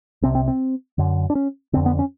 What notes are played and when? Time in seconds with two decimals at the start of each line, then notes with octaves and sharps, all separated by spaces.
0.22 C2 C3 C4
0.35 C4
0.48 C4
0.98 F#2 D3
1.30 D4
1.35 C#4
1.73 D3 C4
1.77 F2
1.86 B3
1.99 C#4